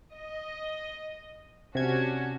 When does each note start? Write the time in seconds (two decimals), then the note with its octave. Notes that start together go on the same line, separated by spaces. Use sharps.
0.12 D#5
1.75 C3 C#4 D4 F#4 G#6